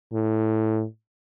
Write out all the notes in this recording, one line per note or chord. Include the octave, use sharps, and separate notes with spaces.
A2